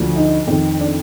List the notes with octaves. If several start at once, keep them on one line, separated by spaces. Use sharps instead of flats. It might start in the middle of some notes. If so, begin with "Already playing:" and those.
Already playing: D2 D3 F3
D#4
F2 D#3
D4